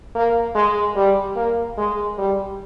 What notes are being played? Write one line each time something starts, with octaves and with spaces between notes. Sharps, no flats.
A#3
G#3
G3
A#3
G#3
G3